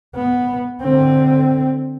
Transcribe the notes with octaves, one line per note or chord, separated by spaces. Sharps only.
B3
D3 C4